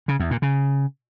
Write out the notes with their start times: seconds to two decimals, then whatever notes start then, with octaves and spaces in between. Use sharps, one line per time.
0.08 C#3
0.20 E2
0.31 A#2
0.42 C#3